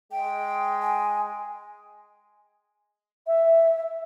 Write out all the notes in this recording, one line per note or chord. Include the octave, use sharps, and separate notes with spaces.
G#3 G5
G#5
E5